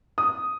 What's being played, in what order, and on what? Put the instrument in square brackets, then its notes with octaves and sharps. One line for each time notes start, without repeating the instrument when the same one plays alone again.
[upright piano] D#6